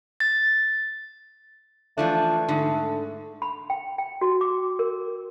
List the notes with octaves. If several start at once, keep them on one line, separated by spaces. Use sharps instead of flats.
A6
E3 F3 A3 D4
G#2 D3
B5
G5
G5
F#4
D6
A#4